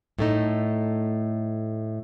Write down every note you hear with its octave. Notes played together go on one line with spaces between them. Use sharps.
A2 A3 D#4